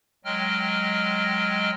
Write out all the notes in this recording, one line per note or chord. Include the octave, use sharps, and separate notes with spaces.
F#3 G#3 D#5 G5 F6